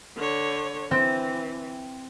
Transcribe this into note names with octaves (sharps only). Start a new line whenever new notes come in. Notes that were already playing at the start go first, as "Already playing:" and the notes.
D3 C#5
E3 C4